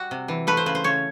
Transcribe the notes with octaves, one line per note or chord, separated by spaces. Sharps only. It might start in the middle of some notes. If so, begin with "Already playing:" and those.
Already playing: G3 F#4
C3
E3
A3 B4
C5
C#3 B4
C5
C#3 C#5